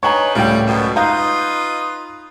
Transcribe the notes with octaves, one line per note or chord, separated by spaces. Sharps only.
D4 D#4 B4 C#5 G#5 A#5 C#6
C#2 A2 G3 A#4 C#5 G5
F#2 B2
D#4 F4 B4 D#5 F5 A#5 G6